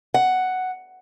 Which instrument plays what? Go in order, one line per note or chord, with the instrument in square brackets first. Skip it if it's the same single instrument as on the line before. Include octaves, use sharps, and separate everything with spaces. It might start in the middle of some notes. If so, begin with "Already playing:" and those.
[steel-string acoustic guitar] F#5